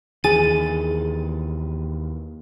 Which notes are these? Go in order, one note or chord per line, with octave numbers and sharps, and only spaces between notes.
D#2 E3 G#4 A6 D#7